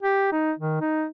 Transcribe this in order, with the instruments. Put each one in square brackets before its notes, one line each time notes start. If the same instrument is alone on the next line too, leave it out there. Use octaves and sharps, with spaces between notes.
[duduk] G4
D#4
D#3
D#4